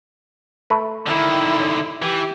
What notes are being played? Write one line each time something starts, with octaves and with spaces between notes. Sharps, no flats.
A3 B4
D3 D#3 E4
C#4
E3 G4